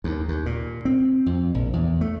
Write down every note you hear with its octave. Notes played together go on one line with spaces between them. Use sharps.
D#2
D#2
A#2
C4
F2
A#1
E2
A3